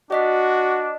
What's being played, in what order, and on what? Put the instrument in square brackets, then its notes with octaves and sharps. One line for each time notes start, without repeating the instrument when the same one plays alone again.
[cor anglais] D4 [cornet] F#4 [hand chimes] D5 D#5 B6